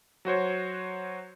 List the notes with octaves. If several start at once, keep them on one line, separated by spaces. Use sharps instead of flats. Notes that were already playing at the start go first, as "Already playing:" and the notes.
F#3 F#4 C5 C#5